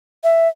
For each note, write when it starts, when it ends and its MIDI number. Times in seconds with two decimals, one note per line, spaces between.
0.24 0.48 76